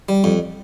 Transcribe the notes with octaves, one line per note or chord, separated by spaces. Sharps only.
G3
F2